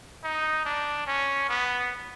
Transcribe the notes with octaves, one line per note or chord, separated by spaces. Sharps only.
D#4
D4
C#4
B3